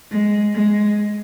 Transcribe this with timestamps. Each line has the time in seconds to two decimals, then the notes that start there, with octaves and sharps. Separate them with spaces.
0.11 G#3
0.55 G#3